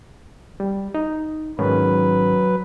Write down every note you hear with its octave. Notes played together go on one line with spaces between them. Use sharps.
G3
D#4
G#2 D#3 F#3 C#4 B4